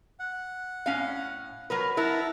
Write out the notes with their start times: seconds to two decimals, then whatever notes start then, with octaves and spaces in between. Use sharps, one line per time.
0.20 F#5
0.86 A2 C#4 F5
1.70 F#3 A#4 B4
1.97 E4 A#4 F#5 A5 A#5